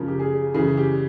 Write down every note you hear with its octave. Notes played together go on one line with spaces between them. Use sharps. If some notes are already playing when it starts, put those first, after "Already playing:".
Already playing: C#3 F3 A#4
G4
G#4
C#3 E3 G#4
G4